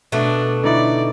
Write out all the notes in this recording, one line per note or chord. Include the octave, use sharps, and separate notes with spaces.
B2 A3 D4
D3 D#4 E4 D5